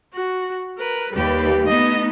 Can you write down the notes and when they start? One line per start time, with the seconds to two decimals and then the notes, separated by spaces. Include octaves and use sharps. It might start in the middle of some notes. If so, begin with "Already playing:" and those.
0.15 F#4
0.79 A#4 B4
1.13 D#2 G3 G4 B4
1.67 A3 B3 D#4 D#5